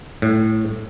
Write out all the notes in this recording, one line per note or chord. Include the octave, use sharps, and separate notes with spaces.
A2